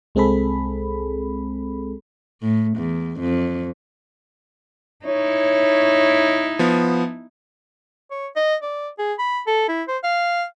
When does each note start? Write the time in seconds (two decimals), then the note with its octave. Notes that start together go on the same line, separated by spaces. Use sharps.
0.15 C2 G#3 C4 G#4 A4 B5
2.42 A2
2.78 E2
3.20 F2
5.05 D#4 E4 C#5
6.59 F3 B3
8.11 C#5
8.36 D#5
8.62 D5
8.99 G#4
9.19 B5
9.47 A4
9.69 E4
9.88 C5
10.04 F5